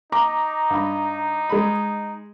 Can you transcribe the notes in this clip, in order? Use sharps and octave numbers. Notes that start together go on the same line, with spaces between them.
D#4 A#5 D6
G2 B5
G#3 B5